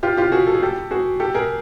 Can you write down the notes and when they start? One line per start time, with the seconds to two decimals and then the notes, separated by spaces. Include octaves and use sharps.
0.03 F4 G4
0.17 F4 G4
0.32 F#4 G#4
0.47 A4
0.55 G#4
0.63 G4 A4
0.91 F#4 G#4
1.20 G4 A4
1.34 G#4 A#4